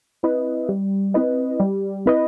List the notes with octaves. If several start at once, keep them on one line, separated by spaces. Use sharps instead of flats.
C4 E4 B4 D#5
G3
C4 E4 B4 D#5
G3
C4 E4 B4 D#5